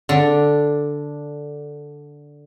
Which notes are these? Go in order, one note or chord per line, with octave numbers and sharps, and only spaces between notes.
D3 D4